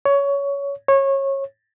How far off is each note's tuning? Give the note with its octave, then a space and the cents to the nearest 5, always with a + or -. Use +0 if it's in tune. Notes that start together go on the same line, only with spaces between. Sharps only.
C#5 +15
C#5 -25